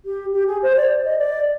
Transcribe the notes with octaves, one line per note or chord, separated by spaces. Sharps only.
G4
G4
G#4
C5
D5
D#5
D5